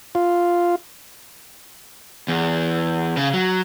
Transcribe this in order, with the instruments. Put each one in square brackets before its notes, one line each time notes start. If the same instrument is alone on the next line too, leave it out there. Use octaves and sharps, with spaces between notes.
[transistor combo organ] F4
[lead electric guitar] E2
C#3
F#3